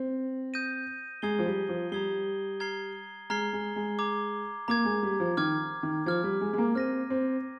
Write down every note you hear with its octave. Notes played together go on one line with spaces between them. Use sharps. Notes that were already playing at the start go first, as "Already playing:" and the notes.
Already playing: C4
D#6 G6 A#6 D#7
G#3 A#5 D#6 G#6 C7 G7
F3
G3
F3
G3 A#5 D#6 G#6 C7 G7
A#5 F6 G#6 C7 G7
G#3 A#5 F6 G#6 C7 G7
G#3
G#3
A#5 D6 G#6
A#3 A#5 D6 G#6
G#3
G3
F3
D#3 D6 F6 G#6
D#3
F3 D6 F6 G#6
G3
G#3
G#3
A#3
C4 F6 A#6 D#7
C4